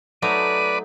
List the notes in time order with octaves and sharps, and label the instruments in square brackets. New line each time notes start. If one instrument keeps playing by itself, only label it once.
[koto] F#3 A3 D#4 [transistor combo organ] B4 D5 [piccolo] D#7